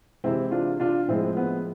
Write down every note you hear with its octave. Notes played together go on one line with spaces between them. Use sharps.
C3 E3 G#3 C4 E4
D4 F4
D4 F4
A2 F3 G#3 C4 E4
B3